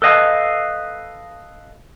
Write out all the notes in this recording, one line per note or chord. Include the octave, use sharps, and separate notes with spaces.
A4 B4 D#5 F5